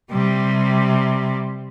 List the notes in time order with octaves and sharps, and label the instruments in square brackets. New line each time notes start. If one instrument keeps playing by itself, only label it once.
[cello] C3 G3